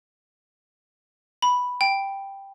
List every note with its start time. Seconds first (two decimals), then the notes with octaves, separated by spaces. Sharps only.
1.42 B5
1.81 G5